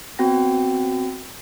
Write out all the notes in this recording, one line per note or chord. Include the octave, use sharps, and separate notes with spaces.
B3 C4 F#4 G5 A#6